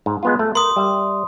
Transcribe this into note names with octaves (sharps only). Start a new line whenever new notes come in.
G#2
G#3 B3 F4
A3
A#4 C6 D#6
G3 E5